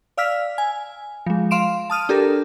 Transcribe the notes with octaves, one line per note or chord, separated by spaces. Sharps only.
D5 F5 E6 F6 B6
G#5
F3 G#3
F5 C6 D7 E7
A5 D#6 F6 D#7
D4 G4 A4 A#4